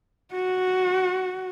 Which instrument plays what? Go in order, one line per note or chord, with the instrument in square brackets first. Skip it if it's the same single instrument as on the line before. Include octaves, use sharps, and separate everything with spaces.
[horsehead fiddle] F#4